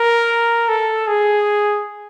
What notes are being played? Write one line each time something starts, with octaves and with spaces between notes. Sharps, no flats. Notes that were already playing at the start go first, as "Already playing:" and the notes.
Already playing: A#4
A4
G#4